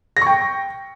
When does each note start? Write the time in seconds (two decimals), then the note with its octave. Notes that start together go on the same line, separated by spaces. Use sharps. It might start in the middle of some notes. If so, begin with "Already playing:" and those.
0.17 A#6
0.22 C#6
0.26 G5